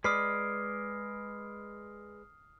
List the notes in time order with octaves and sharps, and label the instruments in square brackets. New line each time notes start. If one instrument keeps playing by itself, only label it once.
[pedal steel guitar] G#3 B4 D5 [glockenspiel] D#6 F6 C7